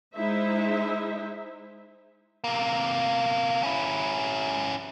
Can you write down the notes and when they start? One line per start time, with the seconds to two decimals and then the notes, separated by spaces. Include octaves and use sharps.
0.15 G#3 D#4 E4 C5 E5
2.44 C3 A#3
3.63 C#4 E4